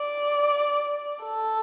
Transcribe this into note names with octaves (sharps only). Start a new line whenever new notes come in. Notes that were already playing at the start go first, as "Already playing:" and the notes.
Already playing: D5
A4